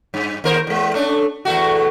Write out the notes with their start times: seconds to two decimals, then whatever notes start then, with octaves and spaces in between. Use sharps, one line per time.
0.14 G2
0.44 D#2 A#4 C5
0.67 E2 G#3
0.94 A3 C#4 D4
1.45 E2 A3 F#4